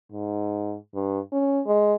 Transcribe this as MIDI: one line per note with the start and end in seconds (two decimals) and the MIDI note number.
0.12 0.76 44
0.94 1.20 43
1.32 1.61 61
1.67 1.94 56